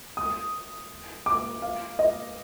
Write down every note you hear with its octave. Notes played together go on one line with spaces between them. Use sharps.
D#6
D6
F5
D#5